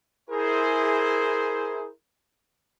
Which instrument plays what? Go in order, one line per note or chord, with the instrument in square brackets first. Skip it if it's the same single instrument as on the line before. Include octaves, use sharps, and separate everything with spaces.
[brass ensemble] E4 G#4 A#4 C5